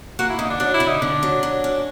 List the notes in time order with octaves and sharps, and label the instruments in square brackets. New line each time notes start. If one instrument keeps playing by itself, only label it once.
[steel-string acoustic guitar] A#3 [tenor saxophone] F#4
[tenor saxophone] E4
[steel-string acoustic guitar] D3 [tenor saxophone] D#4
[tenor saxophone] D4
[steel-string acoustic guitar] F#3 [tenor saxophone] D4
[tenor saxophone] E4
[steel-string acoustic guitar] D3
[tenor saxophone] D#4
[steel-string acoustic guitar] D3 [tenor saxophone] D4
[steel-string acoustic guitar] F#3
F#3
C#4